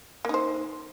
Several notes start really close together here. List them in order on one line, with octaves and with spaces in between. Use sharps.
A#3 D#4 C5